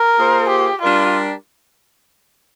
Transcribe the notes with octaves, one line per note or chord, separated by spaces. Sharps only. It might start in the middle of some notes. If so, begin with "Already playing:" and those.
Already playing: A#4
A#3 F4 G#4 C5
G4
G3 D4 F4 G4 A#4 D5